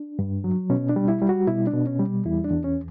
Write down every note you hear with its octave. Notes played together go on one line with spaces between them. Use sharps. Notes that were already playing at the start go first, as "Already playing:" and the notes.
Already playing: D4
G2
F#3
B2 C#4
D4
G3
E4
G3
F#4
B2 E4
D4
B2
C#4
G3
E2 E4
D4
E2
C#4